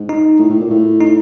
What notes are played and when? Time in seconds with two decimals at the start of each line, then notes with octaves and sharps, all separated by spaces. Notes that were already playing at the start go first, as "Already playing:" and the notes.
Already playing: G#2
0.09 D#4
0.39 A2
0.49 A2
0.60 A#2
0.70 A2
1.00 D#4